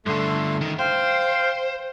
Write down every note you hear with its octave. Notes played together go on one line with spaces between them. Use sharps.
G2 D3 A3 C6
C#2 D#3
C5 F5 G5